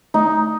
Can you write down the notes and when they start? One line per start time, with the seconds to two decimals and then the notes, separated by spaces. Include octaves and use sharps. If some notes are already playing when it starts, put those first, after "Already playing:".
0.14 A3 D#4